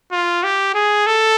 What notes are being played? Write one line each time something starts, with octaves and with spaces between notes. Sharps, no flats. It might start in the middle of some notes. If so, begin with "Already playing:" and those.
F4
G4
G#4
A4